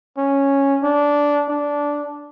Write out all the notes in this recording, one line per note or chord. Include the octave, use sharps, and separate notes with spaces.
C#4
D4
D4